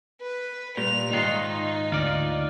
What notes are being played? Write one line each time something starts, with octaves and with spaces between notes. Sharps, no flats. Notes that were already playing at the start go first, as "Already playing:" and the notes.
B4
A#2 G3 F7
G#2 D#3 D#4 F4 F#6 C7
D2 F4 D5